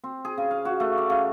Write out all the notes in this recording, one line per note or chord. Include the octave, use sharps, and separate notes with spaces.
C4
G#4
C#3
F5
F#4
A3
D5
C#3